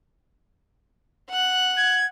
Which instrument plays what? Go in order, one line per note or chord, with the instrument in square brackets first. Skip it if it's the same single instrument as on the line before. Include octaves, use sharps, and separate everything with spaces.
[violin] F#5 F#6
[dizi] G#6